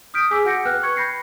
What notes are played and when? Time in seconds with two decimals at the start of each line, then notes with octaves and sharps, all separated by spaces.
0.14 D#6 F6 G6 B6 D7
0.31 G#4 G#5 D6 E6 B6
0.45 F#4 F#5 G6 A#6 C#7
0.65 B4 G5 F6 F#6
0.83 C#6 G#6 C#7
0.96 B5 G6 A#6 C7 C#7